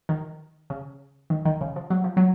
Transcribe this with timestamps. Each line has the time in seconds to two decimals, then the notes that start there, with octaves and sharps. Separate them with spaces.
0.09 D#3
0.70 C#3
1.30 D#3
1.45 D#3
1.61 C#3
1.76 F3
1.90 F#3
2.04 F3
2.17 F#3